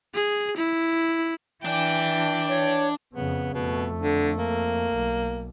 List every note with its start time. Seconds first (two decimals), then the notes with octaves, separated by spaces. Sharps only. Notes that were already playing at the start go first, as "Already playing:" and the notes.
0.14 G#4
0.56 E4
1.65 E3 D4 G5 G#5
2.48 C#5
3.13 F2 C#3 B3
3.54 F2 B2 A3
4.01 D3
4.38 A#3
4.93 B1